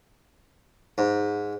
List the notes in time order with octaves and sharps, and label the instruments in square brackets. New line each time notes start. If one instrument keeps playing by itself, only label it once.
[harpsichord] G#2